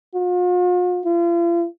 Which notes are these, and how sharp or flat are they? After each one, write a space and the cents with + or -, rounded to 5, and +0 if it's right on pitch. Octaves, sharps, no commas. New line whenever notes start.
F4 +45
F4 -40